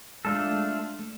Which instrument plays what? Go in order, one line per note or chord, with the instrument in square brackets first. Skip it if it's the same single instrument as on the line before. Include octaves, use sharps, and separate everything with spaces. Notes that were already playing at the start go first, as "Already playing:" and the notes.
[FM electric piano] G#3 [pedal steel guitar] A3 D4 F4 A4
[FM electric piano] G#3
A3